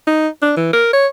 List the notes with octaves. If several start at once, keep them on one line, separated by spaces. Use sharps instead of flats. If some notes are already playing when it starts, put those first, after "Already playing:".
D#4
D4
E3
A#4
C#5